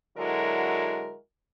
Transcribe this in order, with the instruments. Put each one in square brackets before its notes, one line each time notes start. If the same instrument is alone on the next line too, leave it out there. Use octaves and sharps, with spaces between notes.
[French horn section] D3 F#3 G#3 E4 F#4 A#4